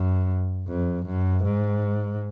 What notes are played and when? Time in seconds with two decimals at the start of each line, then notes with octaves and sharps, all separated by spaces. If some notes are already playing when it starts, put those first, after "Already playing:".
Already playing: F#2
0.67 F2
1.06 F#2
1.44 G#2